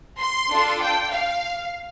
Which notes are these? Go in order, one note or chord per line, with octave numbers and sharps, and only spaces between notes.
C6
D4 F4 A4
G5
F5